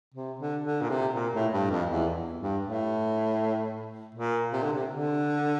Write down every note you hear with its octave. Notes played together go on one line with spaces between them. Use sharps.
C3
D3
D3
A#2
C3
A#2
A2
G2
F2
E2
G2
A2
A#2
C3
D3
C3
D3